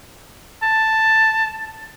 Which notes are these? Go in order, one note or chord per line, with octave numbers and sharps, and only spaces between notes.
A5